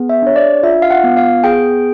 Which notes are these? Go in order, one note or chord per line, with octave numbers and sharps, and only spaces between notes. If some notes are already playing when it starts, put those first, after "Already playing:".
Already playing: B3 G#4
E5
D4 C#5
D5
F4 E5
F5
F#5
B3
F5
G#4 G5